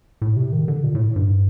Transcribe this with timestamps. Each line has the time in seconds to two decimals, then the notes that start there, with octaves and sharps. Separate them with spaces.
0.22 A2
0.36 C3
0.53 D#3
0.68 D3
0.84 A#2
0.95 A2
1.16 G2